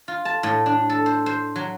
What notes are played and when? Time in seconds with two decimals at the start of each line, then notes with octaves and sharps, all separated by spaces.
0.08 F4
0.25 A5
0.43 A2
0.66 D4
0.90 A4
1.06 C5
1.26 C5
1.56 F#3